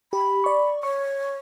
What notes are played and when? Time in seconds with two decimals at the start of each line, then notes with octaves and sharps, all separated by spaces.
0.13 G4 B5
0.44 D5 C#6
0.83 C#5 C#6